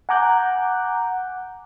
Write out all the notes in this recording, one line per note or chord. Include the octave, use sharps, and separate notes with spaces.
F#5 G#5 A#5 D6 F#6 G6